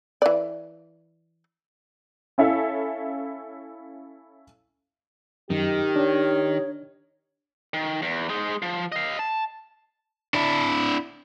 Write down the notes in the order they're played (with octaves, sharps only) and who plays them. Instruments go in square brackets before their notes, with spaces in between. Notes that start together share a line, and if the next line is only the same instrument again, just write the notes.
[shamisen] E3 D5
[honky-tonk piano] C#4 E4 A4 E5 F5
[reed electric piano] F#2 [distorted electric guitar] D#3 [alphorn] G4
[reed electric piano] D4 [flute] C#5
[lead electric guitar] D#3
E2
G#3 D#4
F3
D#5 F5
A5
[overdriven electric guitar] D4 E4